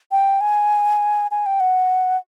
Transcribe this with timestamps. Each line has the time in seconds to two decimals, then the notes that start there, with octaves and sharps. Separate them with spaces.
0.12 G5
0.41 G#5
1.31 G#5
1.46 G5
1.60 F#5